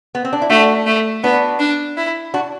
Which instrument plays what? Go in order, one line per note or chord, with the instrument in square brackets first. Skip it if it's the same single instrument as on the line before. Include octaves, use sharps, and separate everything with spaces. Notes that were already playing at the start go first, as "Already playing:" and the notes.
[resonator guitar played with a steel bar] B3
C4
D4
E4
[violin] A3 [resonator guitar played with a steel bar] D4 F#4
[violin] A3
[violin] B3 [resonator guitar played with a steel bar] D4 F#4
[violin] D4
E4
[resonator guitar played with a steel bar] D4 F#4